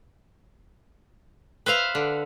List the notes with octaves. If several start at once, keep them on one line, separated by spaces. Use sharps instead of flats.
B4 C5 E5 F5
D3